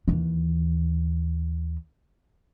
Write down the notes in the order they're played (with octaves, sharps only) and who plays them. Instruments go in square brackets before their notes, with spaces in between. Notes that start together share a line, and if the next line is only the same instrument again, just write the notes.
[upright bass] D#2 E3